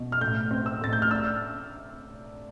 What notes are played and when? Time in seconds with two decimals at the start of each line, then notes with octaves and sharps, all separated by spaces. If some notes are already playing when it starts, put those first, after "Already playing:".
Already playing: B2
0.12 F6
0.21 A2 G6
0.51 C4
0.66 E6
0.81 A2 A6
0.93 G6
1.02 F6
1.11 D4 E6